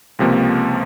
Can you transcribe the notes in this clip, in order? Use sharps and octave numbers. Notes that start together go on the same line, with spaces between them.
C#2 C3 F3 A#3